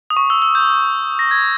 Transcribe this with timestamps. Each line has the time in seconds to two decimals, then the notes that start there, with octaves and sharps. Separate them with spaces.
0.10 D#6
0.17 C#6
0.30 E6
0.42 E6
0.55 G6
1.19 A#6
1.31 G#6